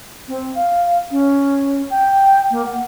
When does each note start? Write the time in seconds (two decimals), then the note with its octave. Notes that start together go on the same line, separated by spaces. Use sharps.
0.28 C4
0.55 F5
1.11 C#4
1.90 G5
2.51 A#3
2.66 F#5